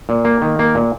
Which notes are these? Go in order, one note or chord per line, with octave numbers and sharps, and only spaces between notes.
A#2
A#3
D#3
A#3
A#2